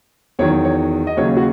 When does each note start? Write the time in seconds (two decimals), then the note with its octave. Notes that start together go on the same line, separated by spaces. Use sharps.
0.39 E2 D#3 F#3 C#5
0.65 C#5
1.07 D#5
1.17 D#2 C#3 F#3 C#5
1.37 F#4